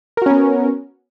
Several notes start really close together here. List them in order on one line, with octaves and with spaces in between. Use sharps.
A#4 F#4 C#4 B3